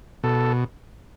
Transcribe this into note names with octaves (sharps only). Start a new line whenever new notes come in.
B2 A4